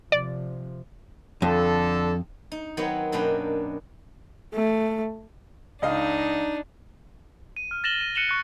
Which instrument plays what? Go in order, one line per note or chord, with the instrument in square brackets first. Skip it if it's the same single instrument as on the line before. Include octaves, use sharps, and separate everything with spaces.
[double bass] C3 F3 [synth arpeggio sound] D5
[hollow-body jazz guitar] F2 [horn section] D3 A4
[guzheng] D#4
D#3 F#3 B3 C4 C#5
F#2 B2 A#3 D4 B4 G5
[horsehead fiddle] A3
[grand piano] C#2 D#5 F5 [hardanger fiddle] D4 D#4
[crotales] D#7
F6
A6 A#6 E7 F#7 G7
D#7
F#6 C#7 D#7 E7 F#7 G7
C#6 F#6